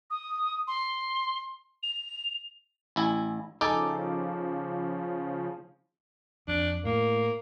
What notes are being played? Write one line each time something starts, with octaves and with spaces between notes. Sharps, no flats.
D#6
C6
F7
A1 E4 G#5
C#3 F3 D#4 A4 G#5 D6
F2 D4
A2 A#3